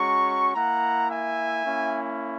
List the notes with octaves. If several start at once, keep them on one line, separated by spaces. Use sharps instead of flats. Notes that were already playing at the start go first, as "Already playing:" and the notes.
Already playing: G#3 C#4 F#4 A#5 C#6
A#3 E4 F#5 A#5
E5 G#5
A#3 C#4 E4